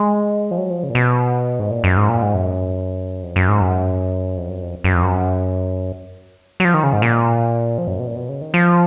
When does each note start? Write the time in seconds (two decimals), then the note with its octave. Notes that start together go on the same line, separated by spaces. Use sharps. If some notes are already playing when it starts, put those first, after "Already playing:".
Already playing: G#3
0.51 F3
0.57 F#3
0.70 F3
0.83 C#3
0.90 A#2
0.95 B2
1.59 G#2
1.71 A#2
1.84 F#2
1.97 G#2
2.09 A#2
2.22 G#2
2.34 F#2
3.23 F2
3.36 F#2
3.48 G#2
3.61 F#2
4.37 F2
4.49 F#2
4.62 F2
4.84 F#2
4.94 F2
5.03 F#2
6.60 F#3
6.65 F3
6.74 D#3
6.84 C#3
6.93 G#2
7.02 A#2
7.78 F3
7.87 F#2
7.99 B2
8.07 A#2
8.16 B2
8.29 C#3
8.41 D#3
8.54 F3